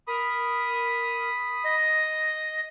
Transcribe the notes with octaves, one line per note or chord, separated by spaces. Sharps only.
A#4 B5 D#6
D#5